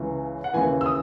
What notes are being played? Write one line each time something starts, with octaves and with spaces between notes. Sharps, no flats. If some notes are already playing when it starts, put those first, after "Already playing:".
Already playing: C#2 C#3 E3
F#5
D#2 C#3 E3 G#5
E6
D#6